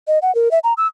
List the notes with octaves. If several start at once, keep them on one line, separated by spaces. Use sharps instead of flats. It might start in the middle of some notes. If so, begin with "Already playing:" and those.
D#5
F#5
A#4
E5
A#5
E6